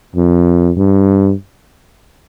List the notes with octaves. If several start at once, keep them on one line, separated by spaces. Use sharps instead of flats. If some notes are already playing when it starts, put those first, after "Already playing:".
F2
G2